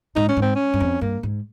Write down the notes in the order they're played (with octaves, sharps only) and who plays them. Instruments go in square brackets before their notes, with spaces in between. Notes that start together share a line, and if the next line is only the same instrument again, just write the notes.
[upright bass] G#2 [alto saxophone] D#4
[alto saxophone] C#4
[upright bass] G#2
[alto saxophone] C4
C#4
[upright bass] G2
F2
[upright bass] G2 [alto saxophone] A#3
[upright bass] G#2